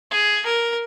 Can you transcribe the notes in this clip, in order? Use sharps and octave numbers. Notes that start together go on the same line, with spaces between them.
G#4
A#4